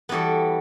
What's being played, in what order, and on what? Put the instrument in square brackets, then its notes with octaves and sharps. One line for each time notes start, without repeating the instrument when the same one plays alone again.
[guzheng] E3 G3 B3 F#4 A4